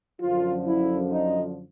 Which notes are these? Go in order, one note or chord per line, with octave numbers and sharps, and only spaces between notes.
F#2 D3 F3 F4
E4
D#4